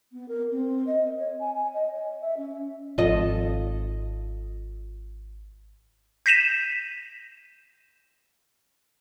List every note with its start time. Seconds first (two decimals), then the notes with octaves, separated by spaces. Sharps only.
0.12 B3
0.28 A#4
0.51 C4
0.87 D#5
1.18 C#5
1.39 G#5
1.55 G#5
1.73 D#5
1.92 C#5
2.21 E5
2.37 C#4
2.98 G#1 F3 F4 A4 D#5
6.26 G6 A#6 B6 D#7 E7